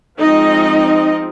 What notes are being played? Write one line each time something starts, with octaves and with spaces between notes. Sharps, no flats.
F3 G#3 C4 D#4 D#5